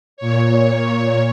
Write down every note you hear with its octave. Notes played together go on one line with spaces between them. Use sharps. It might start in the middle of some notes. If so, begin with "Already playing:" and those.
A#2 C#5